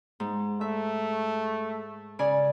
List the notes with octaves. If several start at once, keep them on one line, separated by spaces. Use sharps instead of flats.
G#2
A3 E5
C#3 D5 G#5